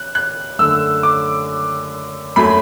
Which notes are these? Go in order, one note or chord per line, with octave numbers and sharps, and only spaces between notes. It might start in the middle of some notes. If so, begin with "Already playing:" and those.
Already playing: F#6
F#6
F#2 D3 A3 E6
D6
F#2 F#3 A3 B5